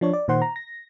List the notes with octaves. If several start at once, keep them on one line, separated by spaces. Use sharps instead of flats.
F3 D4 C#5
D5
A#2 D#3 C5 F#5 C6
A#5
A#6